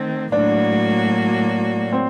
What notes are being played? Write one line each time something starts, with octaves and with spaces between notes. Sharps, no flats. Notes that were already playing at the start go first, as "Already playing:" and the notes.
Already playing: D#3 A3 C4
A2 F#3 A#3 D4 F#4
C4